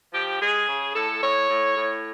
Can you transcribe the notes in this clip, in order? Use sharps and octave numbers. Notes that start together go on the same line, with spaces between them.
F3 G4
G#3 G#4
C#3
A2 A4
A2 C#5
A2
A2